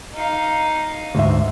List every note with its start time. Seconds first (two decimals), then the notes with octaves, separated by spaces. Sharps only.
0.14 D#4 F5
1.15 D2 G#2 E5